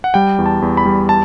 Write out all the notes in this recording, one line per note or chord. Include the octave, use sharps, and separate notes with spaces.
F#5
G3 G5
E2
A5
E2
B5
G3
A5